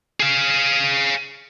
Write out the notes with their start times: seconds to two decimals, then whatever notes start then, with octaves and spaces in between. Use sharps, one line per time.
0.20 G#4 F5